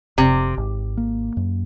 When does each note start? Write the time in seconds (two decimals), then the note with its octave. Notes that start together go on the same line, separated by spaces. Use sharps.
0.18 F1 C3
0.57 G#1
0.97 A#3
1.37 F#2